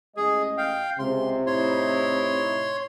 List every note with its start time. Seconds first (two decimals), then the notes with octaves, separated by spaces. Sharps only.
0.17 A1 G#3 G#4 D#5
0.58 F5 G5
0.99 C#2 C3 C6
1.46 A2 D#4 E4 C#5 C6